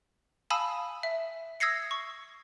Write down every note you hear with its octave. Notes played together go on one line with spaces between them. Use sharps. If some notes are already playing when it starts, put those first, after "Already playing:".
F5 G#5 A5 B5 D#6 E6
E5
D#6 E6 G#6 A#6 C7 C#7
C#6